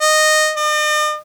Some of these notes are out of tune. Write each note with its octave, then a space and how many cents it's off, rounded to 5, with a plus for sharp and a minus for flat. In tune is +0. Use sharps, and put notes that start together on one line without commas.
D#5 -10
D#5 -45